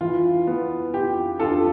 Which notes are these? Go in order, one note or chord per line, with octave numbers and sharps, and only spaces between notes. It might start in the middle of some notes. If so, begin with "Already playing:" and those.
E3 F4
B3
F4 G4
D4 F4 A4